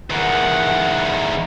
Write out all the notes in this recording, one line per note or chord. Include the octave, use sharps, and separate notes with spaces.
E2 D#3 F#5